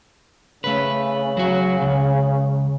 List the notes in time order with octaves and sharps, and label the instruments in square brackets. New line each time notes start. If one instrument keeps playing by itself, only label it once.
[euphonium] C#3 [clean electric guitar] A3 B4
[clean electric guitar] F#3 F#4
C#2